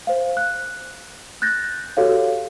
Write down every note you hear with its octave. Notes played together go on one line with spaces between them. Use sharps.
C5 F5
F#6
F#6 G6 A6 A#6
F#4 G4 A4 C#5 F5